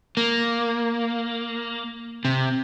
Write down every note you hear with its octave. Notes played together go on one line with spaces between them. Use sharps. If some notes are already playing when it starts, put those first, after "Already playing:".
A#3
C3